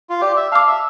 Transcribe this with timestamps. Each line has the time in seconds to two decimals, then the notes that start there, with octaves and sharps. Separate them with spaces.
0.10 F4
0.21 G4 D5
0.37 E5
0.52 F5 A5 D6
0.67 E5